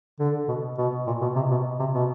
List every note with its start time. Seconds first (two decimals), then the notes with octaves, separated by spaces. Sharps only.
0.20 D3
0.49 B2
0.78 B2
1.07 A#2
1.22 B2
1.36 C3
1.51 B2
1.80 C3
1.94 B2